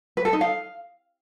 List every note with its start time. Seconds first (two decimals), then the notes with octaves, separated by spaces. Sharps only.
0.17 B4
0.25 A4
0.33 D#4
0.41 F5